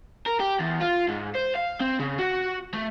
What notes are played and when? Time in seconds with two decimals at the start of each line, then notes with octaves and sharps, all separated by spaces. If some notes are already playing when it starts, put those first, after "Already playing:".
0.26 A#4
0.40 G4
0.59 E2
0.80 F4
1.08 G#2
1.35 C5
1.56 F5
1.80 C4
1.99 C#3
2.19 F#4
2.74 A3